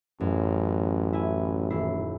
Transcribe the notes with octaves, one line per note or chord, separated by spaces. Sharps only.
A1 F#2
E4 G#5
D#1 E4 C7